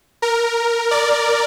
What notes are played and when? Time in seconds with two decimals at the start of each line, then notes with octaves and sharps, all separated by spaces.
0.22 A#4
0.91 D5